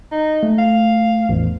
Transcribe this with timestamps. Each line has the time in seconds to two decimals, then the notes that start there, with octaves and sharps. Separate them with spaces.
0.12 D#4
0.43 A3
0.58 F5
1.29 A1 E2